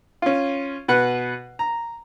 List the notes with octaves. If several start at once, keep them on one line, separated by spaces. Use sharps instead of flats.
C#4 F4
B2 B4 F#5
A#5